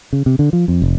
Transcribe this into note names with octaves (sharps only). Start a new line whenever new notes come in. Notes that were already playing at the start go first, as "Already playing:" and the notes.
C#3
C3
D3
F3
F2
F1